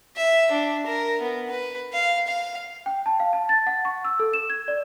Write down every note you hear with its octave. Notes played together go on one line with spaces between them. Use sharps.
E5
D4
A#4
B3
B4
F5
F5
G5
A5
F5
A5
A6
F#5
C#6
E6
A4
E7
G#6
D5